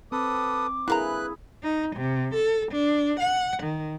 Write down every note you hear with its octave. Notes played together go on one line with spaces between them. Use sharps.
C4 A4 B4 D6 D#6
D3 A#3 E4 G#4 B4 A#5 F#6
D#4
C3
A4
D4
F#5
D#3